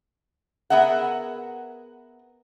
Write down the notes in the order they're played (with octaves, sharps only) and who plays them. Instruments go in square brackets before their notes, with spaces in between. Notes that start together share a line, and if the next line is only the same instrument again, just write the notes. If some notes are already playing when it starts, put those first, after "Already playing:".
[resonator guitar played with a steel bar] B3 G#4 A#4 E5 F#5